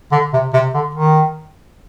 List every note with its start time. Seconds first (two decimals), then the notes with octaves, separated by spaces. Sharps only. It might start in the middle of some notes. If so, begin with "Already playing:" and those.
0.12 D3
0.33 C3
0.53 C3
0.74 D3
0.95 D#3